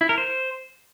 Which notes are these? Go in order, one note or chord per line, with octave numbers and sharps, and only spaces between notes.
E4
A#4
C5